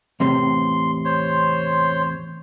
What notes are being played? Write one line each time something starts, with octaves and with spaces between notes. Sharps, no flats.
E2 A2 C3 C6
C5 C#5 C6